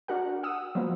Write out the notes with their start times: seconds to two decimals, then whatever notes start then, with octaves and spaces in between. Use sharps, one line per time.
0.08 D4 F#4 A#4 F#5
0.43 F#5 D#6 E6
0.75 F3 F#3 A#3 B3